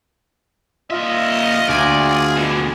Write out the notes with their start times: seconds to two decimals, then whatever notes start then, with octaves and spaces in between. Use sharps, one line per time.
0.90 A#2 F4 D#5 E5
1.69 D2 D5 G#5
1.99 G#4
2.37 B2 D3